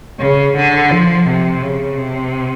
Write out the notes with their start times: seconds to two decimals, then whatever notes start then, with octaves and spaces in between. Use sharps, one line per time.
0.20 C#3
0.56 D3
0.91 F3
1.27 C3
1.63 C#3
1.97 C3